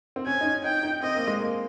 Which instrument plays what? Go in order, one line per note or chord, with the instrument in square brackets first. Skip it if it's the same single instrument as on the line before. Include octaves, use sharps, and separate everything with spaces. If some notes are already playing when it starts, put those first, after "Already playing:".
[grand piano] C4
[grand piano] C#4 [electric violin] G#5
[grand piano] D#4
C#4
[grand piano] D#4 [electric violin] G5
[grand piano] D#4
[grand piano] C4 [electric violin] D#5
[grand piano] A#3
G#3
A#3